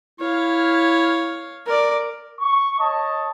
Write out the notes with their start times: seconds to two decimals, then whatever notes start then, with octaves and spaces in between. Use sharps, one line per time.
0.20 E4 C#5 F5
1.66 A#4 D5
2.40 C#6
2.79 C#5 D#5 A5